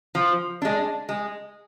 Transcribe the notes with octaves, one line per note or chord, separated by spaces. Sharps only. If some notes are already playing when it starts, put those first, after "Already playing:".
F3
G#3 D4
G#3